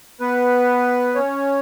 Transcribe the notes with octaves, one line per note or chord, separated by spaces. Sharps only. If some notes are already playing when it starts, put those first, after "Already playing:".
B3 B4
C#4 C#5